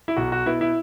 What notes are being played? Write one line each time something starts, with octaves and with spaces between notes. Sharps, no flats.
E4
B1 F#4
F#4
B2 B3 E4
E4